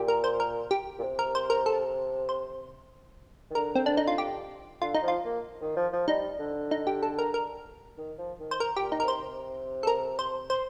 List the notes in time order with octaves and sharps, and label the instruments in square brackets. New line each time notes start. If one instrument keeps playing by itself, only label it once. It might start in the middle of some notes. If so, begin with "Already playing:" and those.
Already playing: [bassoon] A#2 [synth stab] G4
[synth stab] A#4
C5
A#4
G4
[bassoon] A#2
C3
[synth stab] A#4
C5
A#4
A4
C5
[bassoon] D#3
[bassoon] D3 [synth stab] A#4
[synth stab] C4
D4
D#4
F4
G4
[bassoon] D3 [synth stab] F4
[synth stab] D#4
[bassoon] F3
[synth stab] F4
[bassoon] A#3
D#3
F3
F3
[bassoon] G3 [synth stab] D#4
[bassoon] D3
[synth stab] D#4
G4
A4
A#4
A#4
[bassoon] D#3
F3
D#3
[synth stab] C5
A#4
[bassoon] A#2 [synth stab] G4
[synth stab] D#4
A#4
[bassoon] C3 [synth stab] C5
[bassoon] C3
[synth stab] A4
A#4
C5
C5